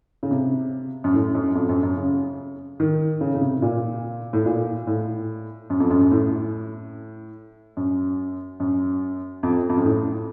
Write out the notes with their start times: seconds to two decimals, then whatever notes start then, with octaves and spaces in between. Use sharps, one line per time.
0.23 C#3
0.31 C3
1.04 F#2
1.14 A2
1.35 F#2
1.55 F2
1.69 F#2
1.83 F#2
1.97 C#3
2.80 D#3
3.21 C#3
3.35 C#3
3.41 C3
3.62 A#2
4.33 A2
4.46 A#2
4.87 A2
5.70 F#2
5.80 F2
5.91 F#2
6.01 F#2
6.11 A2
7.77 F#2
8.60 F#2
9.43 F2
9.70 F2
9.77 F#2
9.85 A2